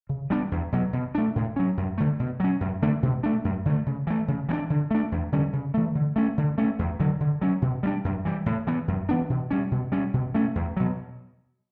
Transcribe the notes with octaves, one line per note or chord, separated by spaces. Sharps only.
C#3
G3 B3 D4
E2
B2 F#3
B2
A3 D4
A2
F#3 C#4
F#2
D3 A3
B2
F#3 C#4
F#2
D3 A3 D4
B2
A3 D4
F#2
D3 A3
C#3
E3 A3
C#3
E3 B3 D4
D3
A3 D4
E2
D3 G3 C#4
C#3
E3 A3
D3
A3 C#4
D3
A3 C#4
E2
D3 F#3
D3
F#3 C#4
B2
G3 B3 D4
F#2
E3 G3
A2
E3 B3
F#2
E3 B3 D4
B2
G3 C#4
B2
G3 C#4
B2
A3 C#4
E2
B2 F#3